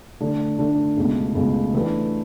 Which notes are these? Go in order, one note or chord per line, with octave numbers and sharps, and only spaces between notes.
D3 A3 D4
D3 A3 D4
C#2 B2 A3
C#2 B2 A3
E3 A3 D4 G4 B4